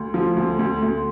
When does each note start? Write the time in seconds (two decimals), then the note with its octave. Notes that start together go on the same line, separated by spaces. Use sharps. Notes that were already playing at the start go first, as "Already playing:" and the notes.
Already playing: D2
0.14 F3
0.37 D2
0.59 D2
0.82 D2